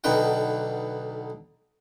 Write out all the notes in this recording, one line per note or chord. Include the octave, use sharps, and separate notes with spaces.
B1 D3 D#4 B4 F#5 G5